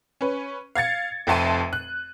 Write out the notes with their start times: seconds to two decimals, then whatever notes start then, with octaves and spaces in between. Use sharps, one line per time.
0.21 C#4 B4
0.75 F5 G#6 A6 C#7
1.27 F1 F2 E5 A5 C6 D#7
1.73 F#6